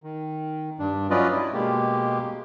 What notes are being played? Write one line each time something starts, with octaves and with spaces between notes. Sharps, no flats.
D#3
G2 D4
F#3 C#4 F4 B4 D5 D#5
E4
B2 G#3 A#3 G4